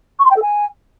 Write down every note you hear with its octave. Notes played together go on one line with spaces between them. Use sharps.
C#6
C6
G5
A4
G#5